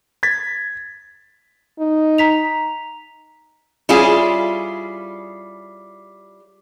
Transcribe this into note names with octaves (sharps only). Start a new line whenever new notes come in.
G#6 A6 B6
D#4
A#5 B6 F7
G3 C#4 E4 F4 G#4